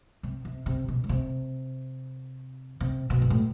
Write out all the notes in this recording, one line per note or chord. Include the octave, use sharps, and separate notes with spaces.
C3
C3
C3
B2
C#3
C3
C3
B2
G#2
A2